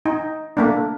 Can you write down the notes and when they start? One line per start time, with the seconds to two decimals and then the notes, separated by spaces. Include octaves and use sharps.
0.06 D#4
0.57 A3 A#3 D4